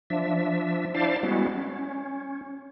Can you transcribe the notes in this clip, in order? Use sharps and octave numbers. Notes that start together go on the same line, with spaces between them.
F3 D4 E5
D4 E4 C5 D5 F5 A5
G3 G#3 B3 C#4 E4 F#4
C#4